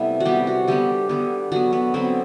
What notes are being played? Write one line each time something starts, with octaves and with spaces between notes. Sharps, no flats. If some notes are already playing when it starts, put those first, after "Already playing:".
Already playing: C3 G3 A3 B3 E4
F#4
C3 G3 B3 G4
F#4
D3 G3 B3 G4
D3 G3 B3
D3 F#3 B3 F#4
B3
D3 F#3 B3 C4